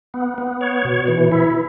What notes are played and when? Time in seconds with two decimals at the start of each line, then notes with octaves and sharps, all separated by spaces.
0.14 B3
0.38 B3
0.61 C#5
0.85 B2
1.08 E3
1.32 E4